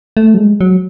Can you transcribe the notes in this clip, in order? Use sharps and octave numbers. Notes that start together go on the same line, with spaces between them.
A3
F#3
G#3
F#3